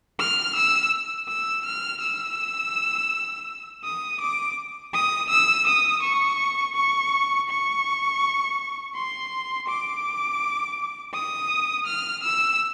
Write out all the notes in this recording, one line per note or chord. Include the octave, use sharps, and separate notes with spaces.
F6
E6
E6
F6
E6
D#6
D6
D#6
E6
D#6
C#6
C#6
C#6
C6
D6
D#6
F6
E6